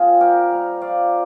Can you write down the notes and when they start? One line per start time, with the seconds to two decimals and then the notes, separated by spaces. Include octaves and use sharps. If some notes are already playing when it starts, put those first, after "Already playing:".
Already playing: G3 C4 F4 G#4
0.20 C3 G4 A#4
0.51 G3 C4
0.81 F3 D5 F5